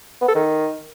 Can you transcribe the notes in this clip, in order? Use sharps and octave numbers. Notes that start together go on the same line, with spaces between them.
B3
A4
D#3